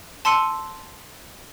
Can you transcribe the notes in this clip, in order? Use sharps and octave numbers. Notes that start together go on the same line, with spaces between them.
A5 C6 E6 C#7 D#7